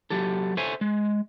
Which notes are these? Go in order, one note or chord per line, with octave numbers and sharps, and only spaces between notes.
F#3 G4 A4
A4 C5 C#5 E5 G#5
G#3